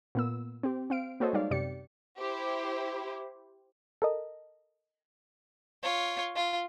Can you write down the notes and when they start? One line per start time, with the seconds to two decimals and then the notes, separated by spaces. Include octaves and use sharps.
0.15 A#2 B3 E6
0.63 C4 G4
0.90 C4 F5 D7
1.20 A#3 F#4 A4 C5 C#5 D#5
1.33 G3 G#3 D#4 D5 F5
1.51 F#2 C3 G4 D5 C#7
2.18 E4 G4 C5
4.02 A4 A#4 D#5
5.83 F4 C#5
6.36 F4